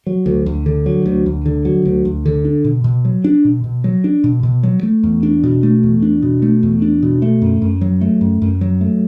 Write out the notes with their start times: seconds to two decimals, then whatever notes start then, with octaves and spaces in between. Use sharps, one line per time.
0.07 F#3
0.26 D2
0.46 D2
0.66 D3
0.86 F#3
1.06 D2
1.26 D2
1.46 D3
1.65 F#3
1.85 D2
2.05 D2
2.26 D3
2.45 D4
2.64 B2
2.84 B2
3.05 F#3
3.24 D4
3.45 B2
3.64 B2
3.84 F#3
4.04 D4
4.24 B2
4.43 B2
4.63 F#3
4.83 A3
5.03 E2
5.23 D4
5.43 B2
5.63 A3
5.83 E2
6.02 D4
6.22 B2
6.42 A3
6.63 E2
6.82 D4
7.03 B2
7.22 A3
7.42 F#2
7.62 F#2
7.81 F#3
8.01 A3
8.21 F#2
8.42 F#2
8.61 F#3
8.81 A3